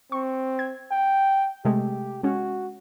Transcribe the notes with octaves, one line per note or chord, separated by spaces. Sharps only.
C4 C#6
G#6
G5
C3 G#3 A3 G4
G#3 C#4 F#4